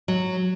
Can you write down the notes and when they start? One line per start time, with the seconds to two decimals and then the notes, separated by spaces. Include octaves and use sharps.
0.08 F#3